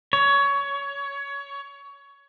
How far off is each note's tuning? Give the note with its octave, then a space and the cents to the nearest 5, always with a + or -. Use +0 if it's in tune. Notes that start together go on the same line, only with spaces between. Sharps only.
C#5 +20